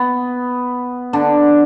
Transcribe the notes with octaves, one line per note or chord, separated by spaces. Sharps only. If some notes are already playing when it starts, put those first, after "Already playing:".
Already playing: B3
D3 D4